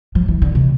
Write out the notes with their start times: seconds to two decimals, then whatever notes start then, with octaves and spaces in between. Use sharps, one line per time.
0.15 F3
0.28 E3
0.42 D3
0.55 C3